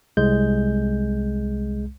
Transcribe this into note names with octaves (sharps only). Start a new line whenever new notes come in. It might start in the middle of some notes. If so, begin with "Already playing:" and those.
C2 G#3 G6